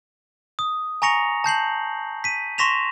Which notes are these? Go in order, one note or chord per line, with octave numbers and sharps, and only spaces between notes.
D#6
G#5 A#5 C#6 A#6 C#7 F7
A5 G6 C7 F#7
B6 D#7
C6 C#6 A#6 B6 E7 F7